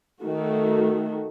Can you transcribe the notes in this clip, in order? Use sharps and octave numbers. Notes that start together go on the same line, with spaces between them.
D#3 A3 F#4